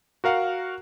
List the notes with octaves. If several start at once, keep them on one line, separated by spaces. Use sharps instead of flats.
F#4 A#4 F5 F#5